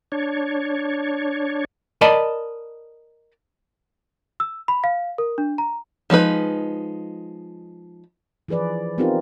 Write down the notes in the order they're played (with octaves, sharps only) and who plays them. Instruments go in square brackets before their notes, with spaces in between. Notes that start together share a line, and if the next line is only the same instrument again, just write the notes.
[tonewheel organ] D4 C#5
[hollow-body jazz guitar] A#4 D5 D#5 A5 B5
[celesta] E6
B5
F5
A#4
D4
A#5
[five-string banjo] F3 G#3 D#4 B4
[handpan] E3 F3 G#4 B4 D5
B3 C4 D#4 F4 G4 A#4